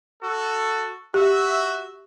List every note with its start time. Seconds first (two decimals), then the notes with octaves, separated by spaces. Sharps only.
0.23 F#4 A4
1.14 F#4 G4 E5